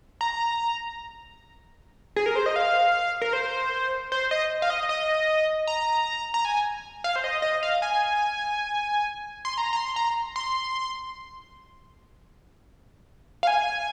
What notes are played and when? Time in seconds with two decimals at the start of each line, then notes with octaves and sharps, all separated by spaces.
0.21 A#5
2.16 G#4
2.26 A#4
2.36 C5
2.46 D#5
2.56 F5
3.22 A#4
3.33 C5
4.12 C5
4.31 D#5
4.62 F5
4.70 D#5
4.89 D#5
5.67 A#5
6.34 A#5
6.45 G#5
7.04 F5
7.16 C5
7.24 D#5
7.42 D#5
7.63 F5
7.82 G#5
9.45 C6
9.58 A#5
9.73 A#5
9.76 C6
9.96 A#5
10.36 C6
13.43 F5
13.47 G#5